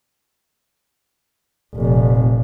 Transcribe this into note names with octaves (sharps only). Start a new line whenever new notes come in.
F1 A#2